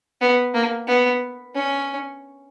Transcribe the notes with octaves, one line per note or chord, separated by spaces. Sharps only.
B3
A#3
B3
C#4